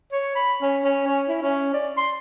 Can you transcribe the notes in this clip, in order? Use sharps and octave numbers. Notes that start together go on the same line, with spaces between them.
C#5
B5
C#4
C#4
C#4
E4
C#4
D5
C6